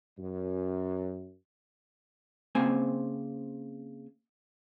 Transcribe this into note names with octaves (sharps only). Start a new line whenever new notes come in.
F#2
C#3 A#3 C4 C5 G#5